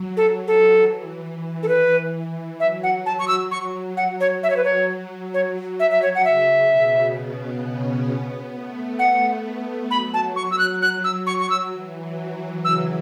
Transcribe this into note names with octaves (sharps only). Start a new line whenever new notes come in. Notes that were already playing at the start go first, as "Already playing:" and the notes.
Already playing: F#3
A4
A4
E3
A4
B4
F#3 E5
F#5
A5
C#6
E6
C#6
F#5
C#5
F#3 E5
C#5
B4
C#5
C#5
E5
E5
C#5
F#5
C#3 E5
B2
B3
C#4
B3
A3
A3 F#5
F#3 B5
A5
C#6
E6
F#6
F#6
E6
C#6
C#6
E6
E3
F#3
E3
C#3 E6